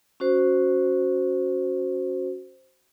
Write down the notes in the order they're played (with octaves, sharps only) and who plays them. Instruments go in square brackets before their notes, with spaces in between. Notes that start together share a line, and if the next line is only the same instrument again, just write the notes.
[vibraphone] C#4 F#4 C5